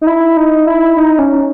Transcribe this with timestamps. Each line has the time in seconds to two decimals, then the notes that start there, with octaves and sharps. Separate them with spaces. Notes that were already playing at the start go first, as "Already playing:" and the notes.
0.01 D#4
0.07 E4
0.37 D#4
0.66 E4
0.97 D#4
1.19 C#4